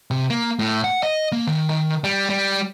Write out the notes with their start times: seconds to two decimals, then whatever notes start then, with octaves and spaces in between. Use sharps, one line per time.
0.11 C3
0.30 A#3
0.59 A2
0.84 F#5
1.03 D#5
1.32 A#3
1.47 D#3
1.70 D#3
2.04 G3
2.30 G3